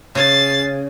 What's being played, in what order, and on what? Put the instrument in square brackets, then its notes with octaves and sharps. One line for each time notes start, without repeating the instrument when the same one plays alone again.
[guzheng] C#3 [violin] A6 C7